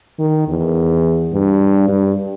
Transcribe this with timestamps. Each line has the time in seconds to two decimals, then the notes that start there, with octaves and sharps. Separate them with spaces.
0.19 D#3
0.48 E2
1.33 G2
1.88 G2